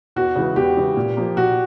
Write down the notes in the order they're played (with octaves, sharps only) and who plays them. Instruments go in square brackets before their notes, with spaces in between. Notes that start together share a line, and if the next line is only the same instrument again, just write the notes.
[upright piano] E2 [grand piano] F#4
[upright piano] C#3 E3 G#3
[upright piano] E2 [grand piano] G4
[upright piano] C#3 E3 G#3
A#2
F3 A#3
[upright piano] A#2 [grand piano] F#4